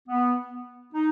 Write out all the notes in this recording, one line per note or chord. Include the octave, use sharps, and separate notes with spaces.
B3
D#4